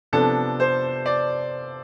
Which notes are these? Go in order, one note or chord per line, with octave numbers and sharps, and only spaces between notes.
C3 F3 B3 D4 A4
C5
D5